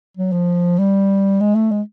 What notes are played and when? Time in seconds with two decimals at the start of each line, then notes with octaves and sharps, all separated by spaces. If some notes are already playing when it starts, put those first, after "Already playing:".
0.17 F#3
0.32 F3
0.79 G3
1.40 G#3
1.55 A3
1.71 G#3